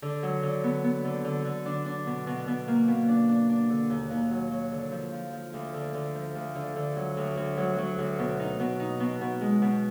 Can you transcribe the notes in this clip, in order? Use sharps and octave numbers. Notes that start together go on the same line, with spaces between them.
D3
F#3
D3
B3
B3
D3
D3
D3
D4
D4
B2
B2
B2
A#3
B2
D4
D4
D4
D3
D#2
D#2
F#3
F#3
D3
F3
F3
F3
D2
D3
D3
F3
D2
D3
D3
F#3
D2
D2
F#3
F#3
D2
B2
D#4
B2
D#4
B2
B2
G#3
B2